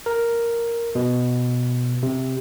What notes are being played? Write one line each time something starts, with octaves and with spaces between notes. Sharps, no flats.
A#4
B2
C3